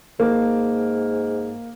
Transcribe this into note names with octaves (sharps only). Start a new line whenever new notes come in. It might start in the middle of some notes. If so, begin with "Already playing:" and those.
G#2 A#3